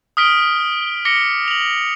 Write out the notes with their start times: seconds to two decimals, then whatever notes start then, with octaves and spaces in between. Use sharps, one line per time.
0.17 D#6 F6 B6 D7 G7
1.05 D6 A#6 B6 C#7 G7
1.48 F7 F#7